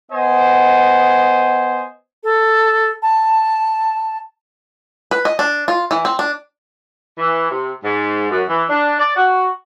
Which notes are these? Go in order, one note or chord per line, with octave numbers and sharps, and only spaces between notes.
B3 C5 D#5 G#5
A4
A5
B4
D#5
D4
F4
E3
C4
D4
E3
C3
G#2
F#2
E3
D4
D5
F#4